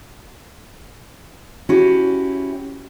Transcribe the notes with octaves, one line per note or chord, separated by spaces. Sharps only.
C#4 E4 F#4 G4